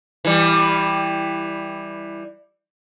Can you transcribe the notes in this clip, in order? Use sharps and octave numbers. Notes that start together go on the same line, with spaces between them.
E3 G3